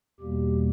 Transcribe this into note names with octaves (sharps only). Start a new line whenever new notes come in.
E2 B2 G3 A#3 G4